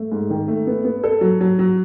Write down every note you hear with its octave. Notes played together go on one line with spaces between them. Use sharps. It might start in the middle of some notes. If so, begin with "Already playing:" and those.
Already playing: A3
G#2
D#3
A3
B3
B3
A4
F#3
F#3
F#3